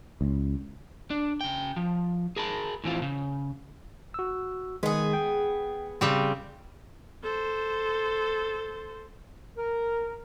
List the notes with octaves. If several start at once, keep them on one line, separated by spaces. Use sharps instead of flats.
C#2
D4
C#3 G5
F3
G#4 A#4 A5 B5
A2 E3 C4 F4
C#3
F#4 E6
D#3 G#3 B3 G#4
G5
C#3 G3 C4
A4 C5
A#4